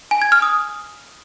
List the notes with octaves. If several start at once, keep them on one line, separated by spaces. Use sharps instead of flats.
G#5
G#6
F6
D#6